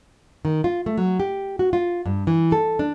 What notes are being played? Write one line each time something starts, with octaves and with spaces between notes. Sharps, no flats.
D#3
F4
A3
F#3
G4
F#4
F4
G2
E3
A4
D4